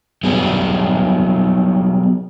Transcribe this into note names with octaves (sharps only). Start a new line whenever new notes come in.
F#3 G3 B3 F#4 G#4